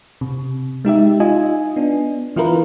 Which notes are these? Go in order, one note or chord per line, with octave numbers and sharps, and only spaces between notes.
C3
G#3 D#4 G4 E5
D#4 F4 D#5 G#5
B3 D4
E3 E4 F4 A#4 B4